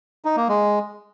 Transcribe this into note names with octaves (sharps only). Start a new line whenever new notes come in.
D#4
A#3
G#3